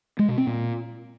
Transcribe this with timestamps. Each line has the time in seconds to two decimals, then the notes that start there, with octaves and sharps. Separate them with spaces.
0.19 G#3
0.28 B2
0.38 C4
0.47 A#2